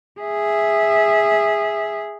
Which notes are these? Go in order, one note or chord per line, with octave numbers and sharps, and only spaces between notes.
G#4 E5